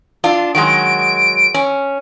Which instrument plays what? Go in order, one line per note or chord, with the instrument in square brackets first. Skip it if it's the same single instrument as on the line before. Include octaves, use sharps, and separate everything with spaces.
[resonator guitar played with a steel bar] D4 F4
[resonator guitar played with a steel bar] D#3 F#3 G#3 [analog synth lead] D7
[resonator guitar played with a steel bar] C#4